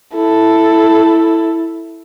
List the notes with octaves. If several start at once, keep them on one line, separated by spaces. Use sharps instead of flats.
E4 A4